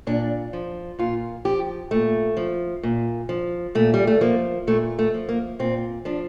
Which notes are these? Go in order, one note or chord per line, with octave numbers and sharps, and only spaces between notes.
A#2 D4
F3
A#2 F4
F3 G4
A#2 A3
F3
A#2
F3
A#2 A3
G3
A3
F3 A#3
A#2 A3
A3
F3
A#3
A#2 C4
F3 D4